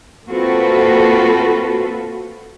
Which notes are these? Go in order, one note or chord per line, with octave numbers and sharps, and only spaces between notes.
A#3 C4 F4 F#4 A4 B4